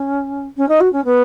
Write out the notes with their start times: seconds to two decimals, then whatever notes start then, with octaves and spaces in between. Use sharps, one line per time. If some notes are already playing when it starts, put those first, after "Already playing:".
Already playing: C#4
0.57 C#4
0.68 D#4
0.80 F#4
0.92 C#4
1.05 B3